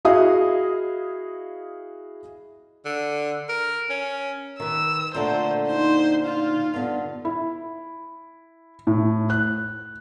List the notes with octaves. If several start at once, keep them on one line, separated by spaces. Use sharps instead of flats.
E4 F#4 G#4 D#5 F5 D#6
D3
A#4
C#4
D#3 B4 E6
A#2 D3 A3 C5
D#4 C5
D#4 F4
G2 D3 B3
E4
A2
F#6